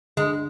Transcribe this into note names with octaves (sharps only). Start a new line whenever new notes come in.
D3 G#3